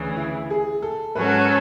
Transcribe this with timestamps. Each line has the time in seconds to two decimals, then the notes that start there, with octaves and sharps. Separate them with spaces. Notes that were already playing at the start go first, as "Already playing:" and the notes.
Already playing: D2 C#3 E3
0.17 E4
0.50 G#4
0.82 A4
1.15 G#2 F#3 C#4 F#4 A4 B4